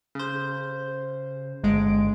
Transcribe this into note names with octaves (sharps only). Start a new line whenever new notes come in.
C#3 C5
G1 G#3 D7